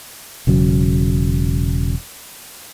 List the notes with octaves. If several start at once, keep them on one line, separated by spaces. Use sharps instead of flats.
E1 C#3 F#3